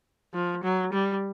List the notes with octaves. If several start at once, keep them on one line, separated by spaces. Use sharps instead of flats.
F3
F#3
G3